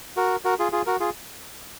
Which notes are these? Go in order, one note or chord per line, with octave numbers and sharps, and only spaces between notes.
F#4 A#4
F#4 A#4
F4 G#4
F4 G#4
F#4 A#4
F4 G#4